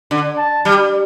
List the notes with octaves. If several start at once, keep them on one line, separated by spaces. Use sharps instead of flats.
D3
A5
G3